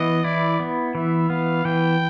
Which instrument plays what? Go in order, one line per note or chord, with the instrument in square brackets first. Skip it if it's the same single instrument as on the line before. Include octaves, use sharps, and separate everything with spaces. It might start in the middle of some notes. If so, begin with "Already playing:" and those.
Already playing: [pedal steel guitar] E3 B3 [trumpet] D#5
[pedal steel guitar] E4 [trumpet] D5
[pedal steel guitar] B3
[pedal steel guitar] E3 [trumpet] E5
[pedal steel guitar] B3 [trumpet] F5
[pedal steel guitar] E3 [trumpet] G5